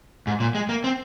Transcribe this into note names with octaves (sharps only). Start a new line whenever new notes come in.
G#2
A#2
G#3
A#3
C4